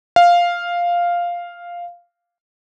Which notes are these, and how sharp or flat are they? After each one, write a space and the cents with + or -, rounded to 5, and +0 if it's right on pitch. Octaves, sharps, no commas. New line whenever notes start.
F5 +0